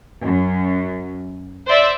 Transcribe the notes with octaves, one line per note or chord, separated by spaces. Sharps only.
F#2
C5 D5 E5